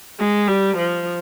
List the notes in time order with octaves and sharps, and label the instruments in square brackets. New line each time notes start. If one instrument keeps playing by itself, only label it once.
[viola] G#3
G3
F3